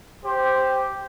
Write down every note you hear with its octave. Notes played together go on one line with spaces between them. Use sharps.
G4 C5